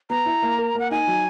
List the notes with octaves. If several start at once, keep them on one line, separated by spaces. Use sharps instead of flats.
B3 A#5
E4
A#3
A#4
A#3 F#5
D#4 G#5
F#3